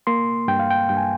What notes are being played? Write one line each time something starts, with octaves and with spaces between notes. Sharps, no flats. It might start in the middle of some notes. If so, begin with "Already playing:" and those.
A#3 C6
G2 G5
F5
G5
G2 G5
G#5